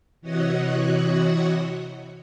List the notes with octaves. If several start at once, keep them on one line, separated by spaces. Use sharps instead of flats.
C3 E3 F#4 C#5 D#5 F#5